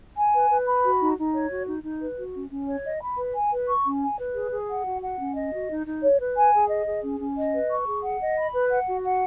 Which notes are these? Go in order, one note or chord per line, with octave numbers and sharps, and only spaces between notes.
G#5
B4
B4
B5
F#4
D#4
D#4
C#5
F#4
D#4
D#4
B4
F#4
C#4
C#4
C#5
D#5
B5
B4
G#5
B4
C#6
C#4
G#5
B4
G#4
G#4
F#5
F#4
F#5
C#4
D#5
F#4
D#4
D#4
C#5
B4
G#5
G#4
D#5
G#4
C#4
C#4
D#5
B4
C#6
G#4
F#5
D#5
B5
B4
F#5
F#4
F#5